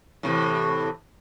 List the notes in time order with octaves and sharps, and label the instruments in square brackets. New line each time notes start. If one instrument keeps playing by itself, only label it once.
[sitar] A2 C3 E3